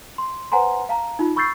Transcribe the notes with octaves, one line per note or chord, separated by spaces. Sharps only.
C6
B4 C5 F#5 G#5 A#5 C6
F5 A5 A#5
D#4 F4
B5 C#6 E6 G6 A6 C7